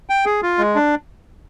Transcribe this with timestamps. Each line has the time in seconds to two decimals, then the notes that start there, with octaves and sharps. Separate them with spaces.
0.10 G5
0.25 G#4
0.42 F4
0.58 G#3
0.75 D4